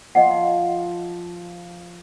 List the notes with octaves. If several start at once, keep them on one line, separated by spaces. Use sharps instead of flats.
F3 D#5 F#5